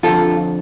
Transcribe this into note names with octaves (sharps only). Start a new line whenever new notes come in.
F2 D3 F3 F4 A4